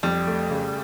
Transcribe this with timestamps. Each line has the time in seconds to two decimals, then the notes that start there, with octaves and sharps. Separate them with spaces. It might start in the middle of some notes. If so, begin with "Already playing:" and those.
0.03 F2 G3
0.27 A3
0.50 C#3